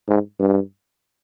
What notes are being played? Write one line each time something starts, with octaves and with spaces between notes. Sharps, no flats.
G#2
G2